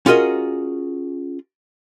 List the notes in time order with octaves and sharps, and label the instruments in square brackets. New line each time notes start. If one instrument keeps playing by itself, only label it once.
[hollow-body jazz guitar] C#4 F4 F#4 G#4 A#4 D#5